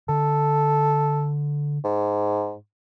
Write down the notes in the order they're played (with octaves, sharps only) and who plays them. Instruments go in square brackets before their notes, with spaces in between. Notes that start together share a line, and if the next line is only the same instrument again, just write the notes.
[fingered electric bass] D3 [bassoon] A4
[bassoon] G#2